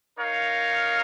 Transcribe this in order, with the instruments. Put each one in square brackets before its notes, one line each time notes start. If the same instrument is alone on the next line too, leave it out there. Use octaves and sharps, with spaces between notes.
[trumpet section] D#4 A#4 C#5 F5